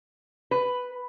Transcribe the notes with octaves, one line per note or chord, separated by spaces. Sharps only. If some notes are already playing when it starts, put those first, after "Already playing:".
B4